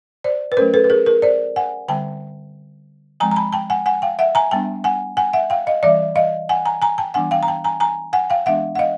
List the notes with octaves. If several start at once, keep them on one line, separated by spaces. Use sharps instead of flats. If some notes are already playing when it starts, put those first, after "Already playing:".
C5 D5
B4
F#3 A3 C#4 A#4 C5
A4 B4
B4
G#4 A#4
G#4 A#4
C5 D5
F#5 G#5
D3 G3 C4 G5 A5
F3 G#3 C4 G#5 A#5
A#5
A5 B5
G5 A5
F#5 G#5
F#5 G#5
F5 G5
E5 F#5
G#5 A#5
G3 B3 D4 G5 A5
F#5 G#5
F#5 G#5
E5 F#5
F5 G5
D#5 F5
E3 G3 C4 D5 E5
D#5 F5
F#5 G#5
G#5 A#5
G#5 A#5
G5 A5
E3 G3 B3 D4 F#5 G#5
F5 G5
A#5
G5 A5
G#5 A#5
G#5 A#5
F#5 G#5
F5 G5
E3 G#3 B3 D4 E5 F#5
F#5
D#5 F5